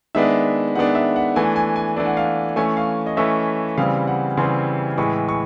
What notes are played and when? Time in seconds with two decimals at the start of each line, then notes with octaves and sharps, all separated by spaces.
0.15 D#3 G#3 B3 D4 E5
0.75 D#3 G#3 B3 D4 F#5
0.95 E5
1.16 F#5
1.36 E3 A3 D4 G#5
1.56 G#5
1.76 G#5
1.96 E3 A3 D4
2.06 F#5
2.17 F5
2.56 E3 A3 C#4 G#5
2.77 F5
3.06 D#5
3.17 E3 A3 C#4 E5
3.78 C#3 E3 G3 C4 F5
4.07 F#5
4.37 C#3 E3 G3 C4 C6
4.97 A2 E3 G#3 C#6
5.29 C#6